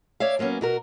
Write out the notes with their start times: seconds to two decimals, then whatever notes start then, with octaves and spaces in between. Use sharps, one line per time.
0.20 C#5 D5 E5 F5
0.39 F#3 A#3 B3 C#4
0.61 B2 F#4 A#4